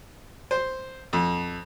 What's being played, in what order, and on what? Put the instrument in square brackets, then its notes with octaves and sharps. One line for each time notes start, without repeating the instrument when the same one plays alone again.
[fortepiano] C5
F2